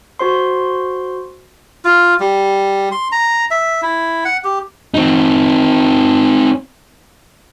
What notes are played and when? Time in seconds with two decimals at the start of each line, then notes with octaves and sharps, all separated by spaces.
0.19 F#4 C5 C6
1.85 F4
2.20 G3
2.92 C6
3.12 A#5
3.51 E5
3.82 E4
4.25 F#5
4.44 G4
4.94 C4 D#4